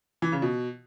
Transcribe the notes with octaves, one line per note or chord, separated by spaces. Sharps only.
E3
C#3
B2